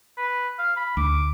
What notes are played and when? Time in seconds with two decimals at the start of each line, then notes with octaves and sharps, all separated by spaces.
0.17 B4
0.59 F5
0.77 B5
0.97 D2 D6